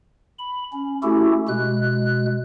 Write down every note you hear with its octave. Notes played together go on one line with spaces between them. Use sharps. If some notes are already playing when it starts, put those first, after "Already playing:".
B5
C#4
A3 C#4 E4 F#4 G4 A4
B2 G#3 F#6